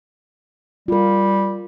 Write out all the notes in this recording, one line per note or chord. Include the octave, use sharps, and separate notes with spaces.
G3 F4 A#4